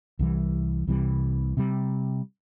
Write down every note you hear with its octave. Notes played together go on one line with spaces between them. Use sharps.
C2 C3 E3 G3
C2 C3 E3 G3
C3 E3 G3